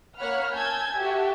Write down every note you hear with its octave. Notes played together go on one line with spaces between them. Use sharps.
A#3 C#5 F#5 B5 F6
G#5 A5 E6 G6 G#6
F#4 G4 A4 E5